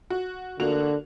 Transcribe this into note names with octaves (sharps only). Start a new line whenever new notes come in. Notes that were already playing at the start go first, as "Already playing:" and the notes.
F#4
D3 A#3 F#4 F7